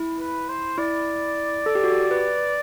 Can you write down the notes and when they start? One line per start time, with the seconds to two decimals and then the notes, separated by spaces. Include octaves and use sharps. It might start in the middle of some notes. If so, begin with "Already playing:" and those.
Already playing: E4
0.19 B4
0.49 C5
0.78 E4 D5
1.66 A4
1.75 G4
1.84 F#4
1.92 G4
2.11 B4